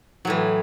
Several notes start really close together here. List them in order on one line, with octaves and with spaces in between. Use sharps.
F#3 A2 E3